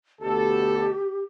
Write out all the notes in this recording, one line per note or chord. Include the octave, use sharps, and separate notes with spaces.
D2 B2 G4 A4